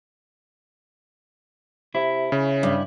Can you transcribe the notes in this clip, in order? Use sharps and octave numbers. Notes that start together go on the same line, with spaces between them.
C3 E4
C#3 C#4
G2